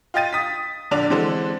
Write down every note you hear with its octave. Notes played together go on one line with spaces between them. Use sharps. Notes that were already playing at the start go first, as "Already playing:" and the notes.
F4 D#5 G5 A6 D#7
D#6 B6
A#1 D3 D4 D5 F7
D3 E3 G#3 C4 D4 A4